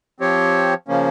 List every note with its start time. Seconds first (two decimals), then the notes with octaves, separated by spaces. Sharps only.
0.20 F3 C4 G4 C#5
0.88 C#3 F3 A#3 C#4